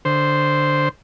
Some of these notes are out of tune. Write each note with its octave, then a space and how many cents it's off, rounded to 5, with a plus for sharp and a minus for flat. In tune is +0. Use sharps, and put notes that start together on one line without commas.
D3 +0 C5 +0